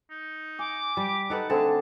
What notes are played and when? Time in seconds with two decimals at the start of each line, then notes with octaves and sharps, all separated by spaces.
0.10 D#4
0.59 G#5 D6
0.97 G3 G4
1.30 D#4 A4 B4 F#5
1.50 D3 A3 C4 G#4 A5